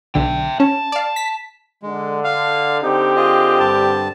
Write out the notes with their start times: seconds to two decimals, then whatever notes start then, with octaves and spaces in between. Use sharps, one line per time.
0.15 B1 D3 E5 G5
0.60 C#4 A5
0.92 D5 F5
1.16 B6
1.83 D3 G#3
2.24 F5
2.82 D3 C4 D#4 G4
3.16 F4 G#4 D#5
3.59 G2 A5